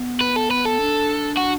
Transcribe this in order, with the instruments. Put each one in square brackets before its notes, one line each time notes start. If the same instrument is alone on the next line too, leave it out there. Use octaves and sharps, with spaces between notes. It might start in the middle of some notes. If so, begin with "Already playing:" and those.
Already playing: [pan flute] B3
[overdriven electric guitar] B4
A4
B4
A4
[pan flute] D4
[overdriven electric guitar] F#4